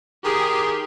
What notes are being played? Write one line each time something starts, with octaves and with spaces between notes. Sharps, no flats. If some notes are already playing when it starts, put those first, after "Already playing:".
D#3 G4 G#4